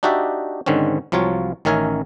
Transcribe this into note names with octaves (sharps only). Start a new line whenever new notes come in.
D4 D#4 F#4 G4 D5 E5
G#2 D3 D#3 C4 C#4
C2 F3 F#3 F4 C#5
A1 D#3 C#4 A#4 E5 G#5